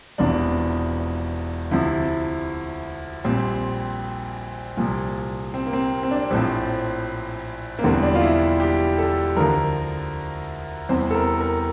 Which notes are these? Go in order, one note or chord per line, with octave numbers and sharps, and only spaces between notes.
E1 E2 C3 F3 D4
D2 C3 F3 E4
A#1 A#2 G3 C4
C2 A#2 F3
C4
A#3
C4
C4
D4
A#1 A2 F3 C4
A#3
E1 E2 D3 G3 C4
D4
F4
E4
G4
A4
D2 D3 F3 A#4
E2 C3 G3 C5
A4
A#4
A#4